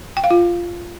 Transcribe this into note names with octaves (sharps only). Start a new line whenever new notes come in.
G5
F5
F4